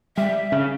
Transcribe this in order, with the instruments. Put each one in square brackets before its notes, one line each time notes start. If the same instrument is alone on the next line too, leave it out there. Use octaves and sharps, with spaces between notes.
[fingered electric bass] G3 [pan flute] E5
[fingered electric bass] C#3